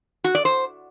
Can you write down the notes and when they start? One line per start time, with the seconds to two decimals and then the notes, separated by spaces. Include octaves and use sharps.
0.24 F#4
0.35 D5
0.45 C5